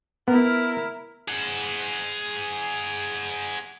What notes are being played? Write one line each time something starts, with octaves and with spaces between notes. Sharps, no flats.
B3 E4 A#4
G#4 F#5